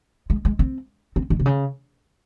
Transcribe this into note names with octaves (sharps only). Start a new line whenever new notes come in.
G#3
G#3
C4
C4
D#3
C3
C#3